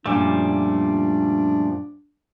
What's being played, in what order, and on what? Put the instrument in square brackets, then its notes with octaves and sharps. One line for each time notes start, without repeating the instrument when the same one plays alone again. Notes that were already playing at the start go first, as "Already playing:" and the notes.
[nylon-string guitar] F#2 A#2 [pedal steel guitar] F3 G3 A3 [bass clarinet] D4